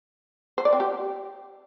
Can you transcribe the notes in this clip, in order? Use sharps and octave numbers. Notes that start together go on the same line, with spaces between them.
C5
D5
C4
G4